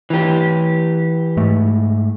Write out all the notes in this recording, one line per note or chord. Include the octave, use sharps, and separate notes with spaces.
E3 G4
G#2 A3